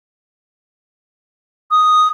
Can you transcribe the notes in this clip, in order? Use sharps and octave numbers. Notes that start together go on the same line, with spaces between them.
D#6